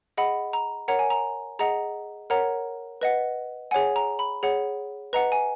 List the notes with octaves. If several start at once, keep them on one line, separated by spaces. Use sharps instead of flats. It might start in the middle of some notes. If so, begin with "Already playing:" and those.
G#4 D#5 F#5 B5
A#5
A#4 C#5 F#5 A#5
G#5
A#5
G#4 D#5 F#5 A#5
A#4 C#5 F#5 A#5
B4 D#5 F#5
G#4 C#5 F#5 G#5
A#5
B5
G#4 C#5 F#5
B4 D#5 F#5 A#5
G#5